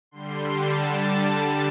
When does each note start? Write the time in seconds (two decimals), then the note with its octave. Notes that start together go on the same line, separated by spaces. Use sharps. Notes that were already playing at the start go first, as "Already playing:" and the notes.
0.11 D3 G3 C6
0.60 A5